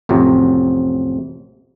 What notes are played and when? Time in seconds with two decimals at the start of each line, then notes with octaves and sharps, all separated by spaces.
0.09 A1 F2 C3 F#3